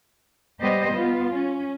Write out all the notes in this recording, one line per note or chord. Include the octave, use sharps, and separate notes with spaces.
G3 B3 G4 C5 D#5
B3 F4
C#4